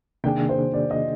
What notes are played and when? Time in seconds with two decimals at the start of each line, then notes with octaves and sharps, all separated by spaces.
0.24 C3 D#3 A#3 D4 G#4 G5
0.49 C5
0.74 D5
0.91 D#5